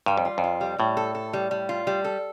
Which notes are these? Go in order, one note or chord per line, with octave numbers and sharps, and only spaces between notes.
G2 G3
F2
F4
F2
F4
G3
A2 G3
A4
A4
G3
G3
F4
G3
A4